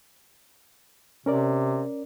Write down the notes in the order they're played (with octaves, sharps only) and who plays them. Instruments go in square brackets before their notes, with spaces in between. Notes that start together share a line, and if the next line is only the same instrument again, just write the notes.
[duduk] C3 [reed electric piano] C#4 A#4 D5